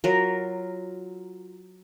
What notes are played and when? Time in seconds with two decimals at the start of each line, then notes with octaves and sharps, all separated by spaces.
0.04 F#3 F4 A#4